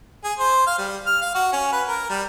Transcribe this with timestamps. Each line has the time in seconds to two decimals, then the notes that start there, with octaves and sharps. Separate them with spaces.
0.24 G#4
0.39 C5
0.67 F5
0.79 G3
1.06 F6
1.22 F5
1.35 F#4
1.53 C#4
1.73 B4
1.88 A#4
2.10 G3